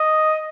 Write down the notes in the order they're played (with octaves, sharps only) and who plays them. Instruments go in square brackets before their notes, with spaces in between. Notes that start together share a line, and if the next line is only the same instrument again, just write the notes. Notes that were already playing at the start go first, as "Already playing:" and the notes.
Already playing: [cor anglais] D#5